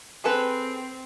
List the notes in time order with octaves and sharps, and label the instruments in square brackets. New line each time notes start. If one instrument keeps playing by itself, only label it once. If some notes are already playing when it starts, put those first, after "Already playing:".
[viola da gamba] C4 [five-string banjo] G#4 A4 B4